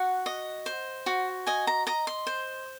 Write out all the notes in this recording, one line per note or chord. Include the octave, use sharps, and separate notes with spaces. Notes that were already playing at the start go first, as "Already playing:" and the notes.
Already playing: F#4 F#5
D#5
C5
F#4
D#5 G#5
A#5
D#5 A#5
C6
C5